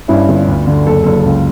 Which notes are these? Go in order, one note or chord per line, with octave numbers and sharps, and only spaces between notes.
G2 C#4 E4
G1
D2
D3
F#1 A4
F#1 A4
A4
C#2